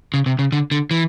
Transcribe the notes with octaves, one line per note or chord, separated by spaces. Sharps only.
C#3
C3
C#3
D3
D3
E3